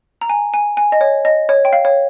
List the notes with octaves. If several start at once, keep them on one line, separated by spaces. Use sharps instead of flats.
A#5
G#5
G#5
G#5
D#5
C#5
D#5
C#5
G5
F5
C#5